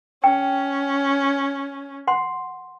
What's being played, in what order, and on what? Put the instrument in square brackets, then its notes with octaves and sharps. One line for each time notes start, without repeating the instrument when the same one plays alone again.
[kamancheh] C#4 [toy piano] G5
[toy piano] F#5 C6